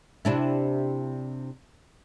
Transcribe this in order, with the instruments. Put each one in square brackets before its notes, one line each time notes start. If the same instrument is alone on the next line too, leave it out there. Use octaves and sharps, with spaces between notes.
[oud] C3 D4 E4